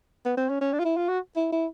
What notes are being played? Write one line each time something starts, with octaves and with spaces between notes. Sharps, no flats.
B3
C4
C#4
C#4
D4
F4
E4
F4
F#4
E4
E4